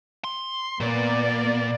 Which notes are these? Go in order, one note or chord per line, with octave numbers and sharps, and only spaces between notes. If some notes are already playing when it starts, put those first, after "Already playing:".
C6
A#2 A#3 B3 D5